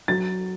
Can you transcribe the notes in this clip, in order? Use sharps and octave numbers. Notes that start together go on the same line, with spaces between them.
F#3 A6